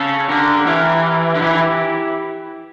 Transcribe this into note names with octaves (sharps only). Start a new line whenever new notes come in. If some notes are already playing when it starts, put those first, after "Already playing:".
Already playing: C#3 A4 C#5
D3 G4 A#4
E3 G4 A#4
D3
E3 E4 G4